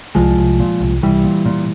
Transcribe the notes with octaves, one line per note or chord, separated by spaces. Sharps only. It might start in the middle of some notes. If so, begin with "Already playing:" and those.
C2 F3 G#3
C2
A#2
C2
C2 E3 G3
A#2
A#2